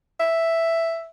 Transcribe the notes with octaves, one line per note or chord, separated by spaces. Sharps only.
E5